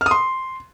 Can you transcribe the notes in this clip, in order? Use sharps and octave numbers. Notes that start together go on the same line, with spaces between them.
F6
D#6
C6